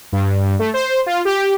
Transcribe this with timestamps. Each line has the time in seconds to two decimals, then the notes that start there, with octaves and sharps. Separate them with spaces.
0.12 G2
0.59 A3
0.74 C5
1.06 F4
1.25 G4